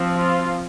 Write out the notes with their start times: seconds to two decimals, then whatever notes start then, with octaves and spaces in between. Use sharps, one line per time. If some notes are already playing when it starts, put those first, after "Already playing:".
Already playing: F3 C4
0.16 F4